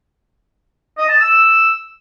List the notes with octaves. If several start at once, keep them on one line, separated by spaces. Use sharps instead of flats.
D#5
A5
E6